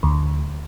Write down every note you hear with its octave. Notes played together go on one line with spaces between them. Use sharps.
D2